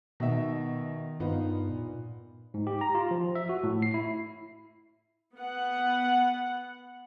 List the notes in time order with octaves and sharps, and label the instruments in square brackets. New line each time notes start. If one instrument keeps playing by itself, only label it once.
[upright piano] B2 D#4 E5 [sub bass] D#3
[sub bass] G2 [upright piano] B3 D#4 F4
[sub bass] A#2
[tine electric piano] G#2
G4
A#5
F4
F3
E5
F#4
A2
C7
E4
[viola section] B3 F#5